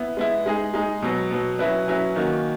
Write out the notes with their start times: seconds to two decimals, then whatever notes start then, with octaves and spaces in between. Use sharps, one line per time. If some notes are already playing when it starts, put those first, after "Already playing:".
Already playing: B3 E4
0.17 G#3 B3 E4
0.46 G#3 D#4 G#4
0.74 G#3 D#4 G#4
1.02 B2 F#3 B3
1.31 B2 F#3 B3
1.59 F#3 C#4 E4 B4
1.88 F#3 C#4 E4 B4
2.16 D#3 A#3 C#4 F#4